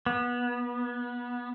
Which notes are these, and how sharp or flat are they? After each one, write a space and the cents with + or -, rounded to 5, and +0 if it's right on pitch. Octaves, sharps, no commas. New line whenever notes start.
B3 -25